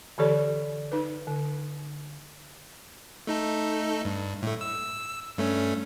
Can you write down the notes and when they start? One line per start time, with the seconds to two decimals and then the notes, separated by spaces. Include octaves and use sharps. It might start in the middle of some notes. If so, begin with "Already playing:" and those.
0.18 D3 E3 G4 A4 C#5 D5
0.92 D#4 B4
1.27 D3
3.27 A3 D#4 A4
4.05 G2
4.43 A2 A3
4.61 E6
5.38 G2 A3 C#4